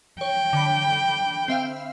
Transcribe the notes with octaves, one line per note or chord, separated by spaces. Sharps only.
C#5 G5
D3 B5
C4 E5 F5